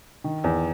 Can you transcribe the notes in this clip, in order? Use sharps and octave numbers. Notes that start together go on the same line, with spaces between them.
D#3
E2